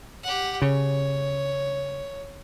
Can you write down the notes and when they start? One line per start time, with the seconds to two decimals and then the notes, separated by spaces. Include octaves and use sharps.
0.23 G4 F#5
0.62 C#3 C#5